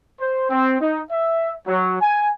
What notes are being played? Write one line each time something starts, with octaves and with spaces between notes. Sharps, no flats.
C5
C4
D#4
E5
F#3
G#5